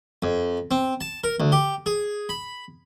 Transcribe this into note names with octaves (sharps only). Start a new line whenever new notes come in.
F2
C4
A5
A#4
D2
G4
G#4
B5